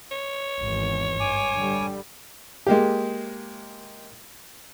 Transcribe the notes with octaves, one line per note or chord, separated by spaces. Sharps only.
C#5
G#1 E2
G2 G#5 D6
D3 G3
G#3 A#3 G4